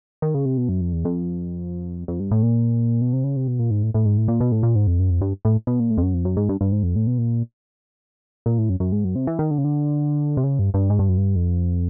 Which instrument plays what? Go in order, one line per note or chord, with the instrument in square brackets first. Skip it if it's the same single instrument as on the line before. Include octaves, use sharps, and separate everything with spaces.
[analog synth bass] D#3
C#3
C3
B2
F#2
F2
E2
F2
F2
G2
A2
A#2
B2
C3
C#3
C3
B2
A#2
G#2
A2
A2
G#2
A2
A#2
B2
A2
A#2
G#2
F2
F#2
F2
G2
A2
B2
A#2
A2
F2
F#2
F2
F#2
G#2
G2
G2
G#2
F2
A2
B2
A#2
A#2
A2
F#2
F#2
G#2
F#2
C3
E3
D#3
D3
C#3
D3
C3
C#3
G2
G2
G#2
G2
F#2
G2
F2